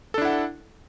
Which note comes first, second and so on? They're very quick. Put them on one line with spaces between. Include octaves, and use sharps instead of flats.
A4 D4 E4 F#5